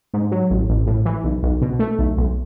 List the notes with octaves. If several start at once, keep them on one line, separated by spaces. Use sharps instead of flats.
G#2
F#3
A1
A1
A2
E3
B1
B1
B2
A3
B1
B1